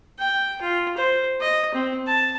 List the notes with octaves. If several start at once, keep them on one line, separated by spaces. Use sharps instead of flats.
G5
F4
C5
D#5
C4
A5